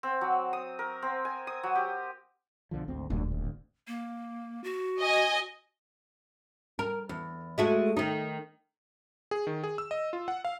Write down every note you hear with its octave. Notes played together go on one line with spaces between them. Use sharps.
C4
F#3
D#6
A#4
C4
G#5
D#6
F#3
G4
B1 D3 F3
G#1 D2 C4
D#1 A#1 F#2 D3 A3
D1 G#1 D2
A#3
F#4
D#5 G#5
A#4
E2
G#3 A3 F#4
D#3 D#4
G#4
D#3
G#4
E6
D#5
F4
F#5
F5